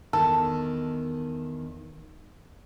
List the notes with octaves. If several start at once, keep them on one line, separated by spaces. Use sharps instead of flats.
E2 D#3 A4